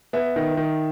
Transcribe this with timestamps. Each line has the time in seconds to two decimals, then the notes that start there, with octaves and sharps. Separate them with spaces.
0.13 B3 E5
0.36 D#3
0.57 D#3